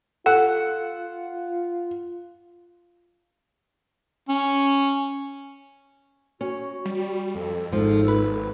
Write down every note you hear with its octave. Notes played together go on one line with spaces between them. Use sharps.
F4 A4 F#5
C#4
C#4 F#4
G3
F2 A4
G#1 G#2 F3 A4
B4